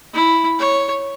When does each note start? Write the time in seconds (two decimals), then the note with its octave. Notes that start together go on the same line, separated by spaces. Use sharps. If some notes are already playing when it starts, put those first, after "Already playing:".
0.14 E4
0.59 C#5